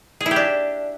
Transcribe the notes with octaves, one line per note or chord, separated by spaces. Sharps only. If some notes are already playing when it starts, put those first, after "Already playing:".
G#4
E4
G4
D4